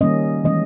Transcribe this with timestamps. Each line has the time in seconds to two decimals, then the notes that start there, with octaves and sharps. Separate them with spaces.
0.01 D#3 G3 A#3 C#4 D#5
0.44 E3 G#3 C#4 D#5